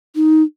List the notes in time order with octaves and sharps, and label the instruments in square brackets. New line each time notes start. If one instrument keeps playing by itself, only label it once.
[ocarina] D#4